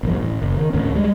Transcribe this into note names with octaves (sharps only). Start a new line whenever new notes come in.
A#1 E2 G2
A1
F#1
D#3
A1 D2 D3 C#4
G3 G#3